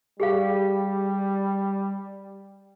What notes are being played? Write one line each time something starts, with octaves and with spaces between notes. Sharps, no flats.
G3 G4 G#4 F5